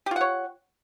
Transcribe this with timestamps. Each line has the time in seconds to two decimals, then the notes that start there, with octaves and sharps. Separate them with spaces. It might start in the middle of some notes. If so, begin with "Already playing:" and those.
0.06 G4
0.11 F4
0.16 F#5
0.21 C#5